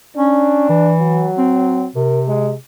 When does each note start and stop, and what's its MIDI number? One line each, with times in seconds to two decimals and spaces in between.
0.17 0.65 61
0.17 0.94 62
0.69 1.31 52
1.00 1.86 54
1.38 1.87 60
1.96 2.55 48
1.96 2.22 70
2.27 2.52 56